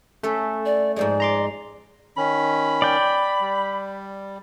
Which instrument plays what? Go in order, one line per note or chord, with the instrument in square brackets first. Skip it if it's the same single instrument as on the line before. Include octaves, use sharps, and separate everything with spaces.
[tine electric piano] A3 [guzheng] C#4 A4 E5
[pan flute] D5
[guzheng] G#2 F3 G#3 [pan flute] D5
[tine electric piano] A#5 C6 D6
[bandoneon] D#3 C#4 [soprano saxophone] B5
[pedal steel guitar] D5 G5
[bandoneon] G3